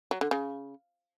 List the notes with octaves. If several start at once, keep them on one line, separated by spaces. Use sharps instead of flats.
F#3
D3
C#3